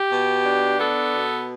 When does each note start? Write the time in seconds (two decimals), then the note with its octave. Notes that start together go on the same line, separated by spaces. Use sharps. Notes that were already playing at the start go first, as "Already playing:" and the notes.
Already playing: G4
0.11 B2
0.46 D4
0.80 B3 A4
1.15 B2